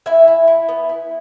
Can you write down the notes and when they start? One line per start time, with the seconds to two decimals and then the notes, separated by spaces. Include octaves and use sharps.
0.06 E4 E5 G#5
0.28 E4
0.48 E4
0.69 B3
0.89 E4